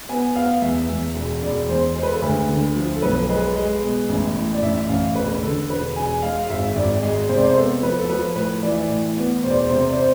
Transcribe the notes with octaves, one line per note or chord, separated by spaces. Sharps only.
B3 G#5
B3 F5
E2 E5
E2
E1
E1 D5
E2 C5
G#3 C5
B4
A4
D2 B4
D3
F3
A4
B1 B4
G#3 B4
G#3
B2
A1
A2
D5
A1 E5
A1 F5
E1 B4
D3 A4
E1 B4
E1 G#5
G#3 F5
F5
G#1 E5
E5
G#1 D5
G#3
C3 C5
D5
C5
B3 A4
F3 B4
A4
F3 B4
A2 B4
E3 D5
E5
D5
A2
B3
E1 C5
D5
C5
C3 C5
D5
C5